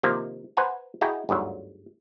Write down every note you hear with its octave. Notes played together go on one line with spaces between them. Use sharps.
C3 D#3 F3 A#3
B4 C5 F#5 G#5 A#5
E4 F#4 G#4 D#5 G5 A#5
G1 D2 G#2 F#3